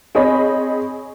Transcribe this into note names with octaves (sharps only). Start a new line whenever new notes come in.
C4 G#4 C#5 D#5 B5